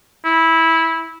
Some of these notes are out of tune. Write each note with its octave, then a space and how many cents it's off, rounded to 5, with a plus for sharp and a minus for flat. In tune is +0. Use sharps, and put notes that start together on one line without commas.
E4 -15